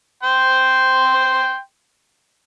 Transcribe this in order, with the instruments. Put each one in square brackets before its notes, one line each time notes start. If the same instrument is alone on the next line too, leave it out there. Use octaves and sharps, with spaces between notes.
[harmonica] G5 C6